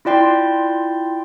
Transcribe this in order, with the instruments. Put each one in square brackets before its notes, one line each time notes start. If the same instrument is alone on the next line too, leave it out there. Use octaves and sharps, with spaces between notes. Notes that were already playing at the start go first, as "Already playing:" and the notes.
[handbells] E4 F4 D5 G5 C6